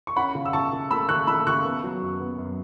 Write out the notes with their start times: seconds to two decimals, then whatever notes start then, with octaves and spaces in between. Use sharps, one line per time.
0.07 C#6
0.16 C#4 F#5 B5
0.35 C#3
0.45 E6
0.53 C#3 A5 C#6
0.73 C#3
0.91 A3 B5 E6
1.09 C#3 C#6 F#6
1.27 A3 B5 E6
1.47 C#3 C#6 F#6
1.65 B3
1.84 F#3
2.02 F#2
2.20 B3
2.38 F#2